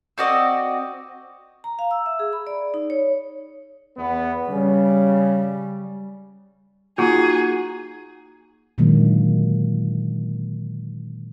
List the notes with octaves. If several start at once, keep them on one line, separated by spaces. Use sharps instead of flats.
C4 F#4 D5 D#5
A#5
F5
E6
E5
G#4
B5
D5
D#4
C#5
E2 B3
C#3 G3 C#4
A#3 D#4 F4 F#4 G#4
A#2 D3 D#3 F#3 G#3 A#3